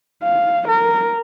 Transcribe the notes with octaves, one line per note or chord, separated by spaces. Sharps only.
F5
A#4